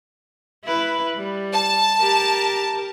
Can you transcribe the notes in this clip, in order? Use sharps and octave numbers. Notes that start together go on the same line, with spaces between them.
E4 B4
G3
A5
G4 A#4